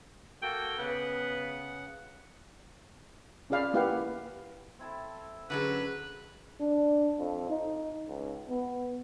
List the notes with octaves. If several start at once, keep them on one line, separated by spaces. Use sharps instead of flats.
A#3 F#4 A4 G5
C#3 B3 F#5
C#4 F4 G#4 D5 F5 B5
A#3 E4 G4 B4 F5 F#5
C4 E4 A4
D3 F#3 C#4 G#4 A4 B4
D4
F2
D#4
C#2
B3